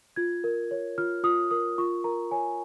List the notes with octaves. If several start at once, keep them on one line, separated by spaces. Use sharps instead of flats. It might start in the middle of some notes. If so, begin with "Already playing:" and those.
F4 G#6
A#4
C#5
F4 F6
F4 D#6
A#4 D#6
F4 C#6
A#4 A#5
C#5 G#5